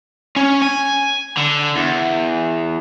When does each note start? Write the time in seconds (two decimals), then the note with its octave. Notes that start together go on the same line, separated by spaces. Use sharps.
0.36 C#4
0.62 G#5
1.38 D3
1.76 E2